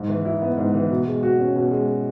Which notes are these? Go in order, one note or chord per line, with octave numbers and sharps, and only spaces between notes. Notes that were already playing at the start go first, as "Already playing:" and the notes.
Already playing: G#2
E3
E4
B3
G#2
E3
B2
G#3
F#4
C#4
B2
G#3